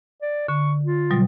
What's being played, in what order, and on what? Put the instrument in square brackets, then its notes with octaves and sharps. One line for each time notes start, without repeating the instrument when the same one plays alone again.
[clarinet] D5
[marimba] D3 [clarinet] C#6
[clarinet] F4
[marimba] B2 F#3 G3